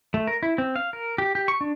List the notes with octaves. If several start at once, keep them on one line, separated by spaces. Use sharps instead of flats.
A3
A#4
E4
C4
F5
A#4
G4
G4
C#6
D4